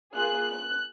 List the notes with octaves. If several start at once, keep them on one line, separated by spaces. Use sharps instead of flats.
A#3 F4 G#4 F#6
F#6